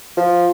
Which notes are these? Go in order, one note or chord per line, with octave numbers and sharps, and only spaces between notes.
F3